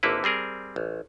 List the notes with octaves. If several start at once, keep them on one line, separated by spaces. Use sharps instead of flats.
G#1 D3 A#3 E4 B4
G3 C4 G#4 A#4
A1